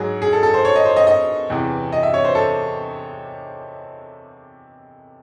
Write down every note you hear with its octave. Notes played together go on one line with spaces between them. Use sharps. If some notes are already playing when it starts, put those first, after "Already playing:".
Already playing: G#2 F#3 G#4
G#4
A4
A4
C5
C#5
D#5
C5
D#5
D#5
E2 C3 E3
D#5
E5
C#5
C5
A4